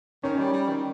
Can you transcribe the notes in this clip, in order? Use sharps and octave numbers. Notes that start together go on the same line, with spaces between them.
D#3 C#4
G3
G3
D#3